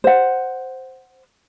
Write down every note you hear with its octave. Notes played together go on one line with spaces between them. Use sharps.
C5 F#5